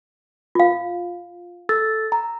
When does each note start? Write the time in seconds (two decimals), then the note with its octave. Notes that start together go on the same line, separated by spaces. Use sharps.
0.55 F4 F5
1.69 A4 E6 A6
2.12 A#5